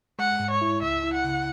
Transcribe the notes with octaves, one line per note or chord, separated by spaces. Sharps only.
G#3 F#5
G#2
C#5
E4
C#2 E5
E4
F#5
C#3